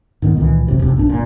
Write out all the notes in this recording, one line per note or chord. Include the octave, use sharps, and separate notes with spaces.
G#2 D#3 G#3 B3
C#2 A#2 D#3 E3
G#1 F#2 C3 E3
E1 F2 C3
A#1 G2 D4
G1 A#2